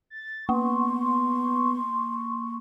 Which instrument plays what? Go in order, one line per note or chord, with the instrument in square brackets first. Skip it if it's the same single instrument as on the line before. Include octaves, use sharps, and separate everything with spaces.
[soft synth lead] A6
[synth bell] A#3 [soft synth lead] B3 [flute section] C6 C#6